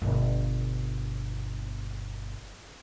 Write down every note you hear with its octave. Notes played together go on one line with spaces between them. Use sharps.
G1 B2